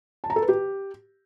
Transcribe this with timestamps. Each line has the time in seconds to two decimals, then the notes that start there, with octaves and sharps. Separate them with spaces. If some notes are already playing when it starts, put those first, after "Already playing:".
0.24 A5
0.30 A#5
0.36 A4
0.42 B4
0.49 G4